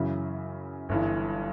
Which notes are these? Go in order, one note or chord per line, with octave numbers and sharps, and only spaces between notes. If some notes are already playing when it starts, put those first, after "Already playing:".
Already playing: F#2 C#3 E3
G1 G2 E3